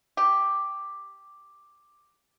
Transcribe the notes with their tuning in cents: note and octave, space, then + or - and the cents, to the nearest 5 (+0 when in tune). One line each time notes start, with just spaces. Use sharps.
G4 +0